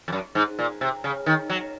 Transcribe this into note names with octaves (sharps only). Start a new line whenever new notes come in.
F2
F#2
G#2
A#2
C3
C#3
D#3
F#3